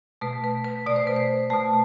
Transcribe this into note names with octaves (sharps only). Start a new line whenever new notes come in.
B2 A3 B4
B4
B4
B2 A3 D5
C5
B4
C5
B2 A3 A5